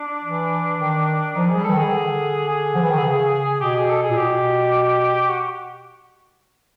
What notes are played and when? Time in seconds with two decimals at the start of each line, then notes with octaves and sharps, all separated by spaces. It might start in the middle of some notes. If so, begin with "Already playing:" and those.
Already playing: D4
0.23 E3
0.79 D#3
1.36 F3 D#4
1.49 G#4
1.55 G3
1.64 E3 A4
1.73 D#3
1.78 G#4
1.85 D#3
1.92 D3
2.48 G#4
2.75 F3
2.82 E3
2.90 D#3
2.97 D3
3.04 C#3
3.60 B2 G4
3.75 G#4
3.89 A4
4.03 G#4
4.10 A#2
4.16 B2 G4
5.29 F#4